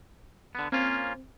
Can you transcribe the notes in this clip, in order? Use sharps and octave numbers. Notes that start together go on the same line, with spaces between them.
D3 B3
A#3 C4 C#4 F4